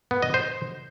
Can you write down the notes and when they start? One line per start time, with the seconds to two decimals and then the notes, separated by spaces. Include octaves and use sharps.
0.11 B3
0.22 D#5
0.34 C5